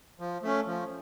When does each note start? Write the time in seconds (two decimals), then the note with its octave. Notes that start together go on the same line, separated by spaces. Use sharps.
0.19 F3
0.43 A3 C#4
0.66 F3